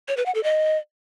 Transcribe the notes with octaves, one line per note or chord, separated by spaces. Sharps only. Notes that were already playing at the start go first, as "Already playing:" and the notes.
C#5
B4
F#5
A4
D#5